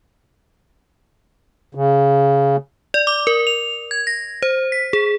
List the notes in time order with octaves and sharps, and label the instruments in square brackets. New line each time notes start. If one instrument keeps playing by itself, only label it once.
[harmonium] C#3
[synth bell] D5
D6
A#4
F7
G#6
A#6
C5
B6
G#4